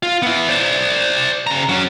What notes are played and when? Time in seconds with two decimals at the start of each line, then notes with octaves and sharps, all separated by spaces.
0.03 F4
0.22 B3 E4
0.49 C5 D5
1.47 C#3 A#5
1.69 F#3 C#4